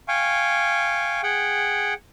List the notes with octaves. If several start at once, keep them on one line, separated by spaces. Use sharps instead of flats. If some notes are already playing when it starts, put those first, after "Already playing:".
F5 G5 G#5 C#6
G#4 F#5 G5